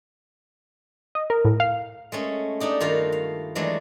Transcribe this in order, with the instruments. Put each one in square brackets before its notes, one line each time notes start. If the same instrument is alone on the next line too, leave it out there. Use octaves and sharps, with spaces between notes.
[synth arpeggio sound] D#5
A#4
A2
F5
[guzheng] G#3 A3 C#4
A3 D4 D#4 G4
G2 D#3 F4 F#4 F5
F5
E3 F#3 G#3 A3 D4